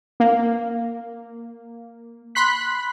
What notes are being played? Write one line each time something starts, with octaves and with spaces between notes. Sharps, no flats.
A#3
B5 C6 F#6 B6